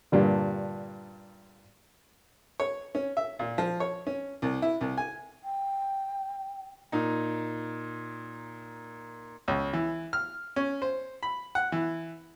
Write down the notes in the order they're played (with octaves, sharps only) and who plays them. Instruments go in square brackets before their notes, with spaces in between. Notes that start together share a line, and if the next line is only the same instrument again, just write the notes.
[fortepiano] G2 A#2 D3
C#5
C#4
E5
A#2
F3
C#5
C#4
C2
E4
C2
G#5
[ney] G5
[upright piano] A#2 D#4
[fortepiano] C#2
E3
F6
C#4
C5
B5
F#5
E3